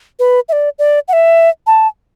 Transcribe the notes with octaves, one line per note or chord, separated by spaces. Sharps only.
B4
E5
D5
D5
F#5
E5
A5